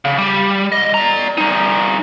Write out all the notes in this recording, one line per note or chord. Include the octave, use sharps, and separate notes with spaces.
C#3
G3
C2 D#5
D5 A#5
G3 D#4